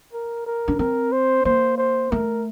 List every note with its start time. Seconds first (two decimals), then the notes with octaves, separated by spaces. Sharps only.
0.13 A#4
0.46 A#4
0.68 D4
0.79 C4 A#4
1.12 C5
1.45 A#3 C5
1.78 C5
2.11 A3 A#4